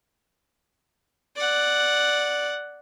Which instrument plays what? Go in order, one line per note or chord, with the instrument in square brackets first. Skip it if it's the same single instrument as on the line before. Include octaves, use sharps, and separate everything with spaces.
[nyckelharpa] D5 F#5